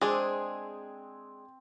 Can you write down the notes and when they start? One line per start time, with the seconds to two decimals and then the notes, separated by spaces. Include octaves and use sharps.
0.01 G#3 C4 D4 G#4